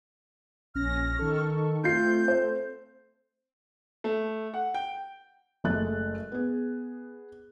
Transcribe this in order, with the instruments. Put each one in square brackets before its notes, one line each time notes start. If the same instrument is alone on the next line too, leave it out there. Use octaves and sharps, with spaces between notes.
[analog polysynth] A#1 C#4 A#6 [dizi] F6
[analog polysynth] D#3 A4 C#6
[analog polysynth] A3 C4 [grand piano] F4 C7 [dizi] G6
[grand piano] C5
A3
F#5
G5
[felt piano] F#1 G#3 A3 F#6 A6
B3 G#4